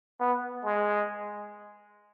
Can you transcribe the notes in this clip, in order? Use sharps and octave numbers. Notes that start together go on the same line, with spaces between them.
B3
G#3